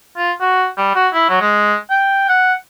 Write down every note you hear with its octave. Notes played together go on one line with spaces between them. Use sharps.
F4
F#4
G3
F#4
E4
F#3
G#3
G5
F#5